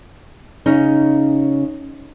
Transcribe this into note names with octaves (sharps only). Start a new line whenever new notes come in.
C#3 C#4 D#4